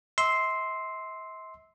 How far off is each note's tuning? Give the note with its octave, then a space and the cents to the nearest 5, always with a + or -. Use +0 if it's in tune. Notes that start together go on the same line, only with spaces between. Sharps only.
E5 -45 C6 +0 E6 -15